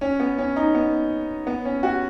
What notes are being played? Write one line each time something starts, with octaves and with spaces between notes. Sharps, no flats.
C#4
B3
C#4
D#4
B3
B3
C#4
F#4